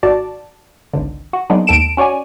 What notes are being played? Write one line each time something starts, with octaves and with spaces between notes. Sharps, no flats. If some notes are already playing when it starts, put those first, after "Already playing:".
G#1 F#4 D5 A5
G#1 C#2 D3
F#4
F#3 G#3 A#3 B3 D4 D#4
D#2 G#2 A4 D7 E7
C#4 F#4 C#5 D5 G#5